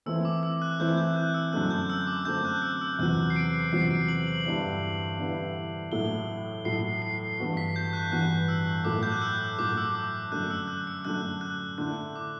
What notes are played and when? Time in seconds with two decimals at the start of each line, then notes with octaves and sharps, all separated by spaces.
0.06 E3 A3 C4 E4 E6
0.25 D6
0.43 E6
0.62 F#6
0.80 E3 A3 C4 E4 G6
0.97 G6
1.16 F#6
1.34 E6
1.52 F#2 D3 A3 C4 F#6
1.70 G6
1.90 E6
2.07 D6
2.25 F#2 D3 A3 C4 G6
2.45 F#6
2.62 E6
2.81 E6
2.99 E2 C3 F#3 F#6
3.30 C7
3.36 D7
3.72 E2 C3 F#3 C7
3.90 D7
4.08 F#7
4.27 F#7
4.46 G2 D3 G3 B3 E4
5.19 G2 D3 G3 B3 E4
5.92 A2 F#3 A3 E4 G7
6.65 A2 F#3 A3 E4 C7
7.02 C7
7.39 G2 E3 B3 F#4
7.57 B6
7.76 G6
7.93 F#6
8.12 G2 E3 B3 F#4 F#6
8.48 E6
8.85 A2 F#3 A3 D6
9.03 G6
9.12 F#6
9.22 E6
9.59 A2 F#3 A3 D6
9.77 E6
9.95 D6
10.32 F#2 D3 A3 F#6
10.50 E6
10.68 F#6
10.87 E6
11.05 F#2 D3 A3 F#6
11.41 F#6
11.78 D3 A3 E4 F#6
12.15 D6